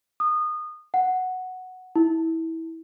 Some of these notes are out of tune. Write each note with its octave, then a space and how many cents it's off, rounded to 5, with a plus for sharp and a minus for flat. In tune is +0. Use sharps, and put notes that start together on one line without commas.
D#6 -25
F#5 +0
E4 -20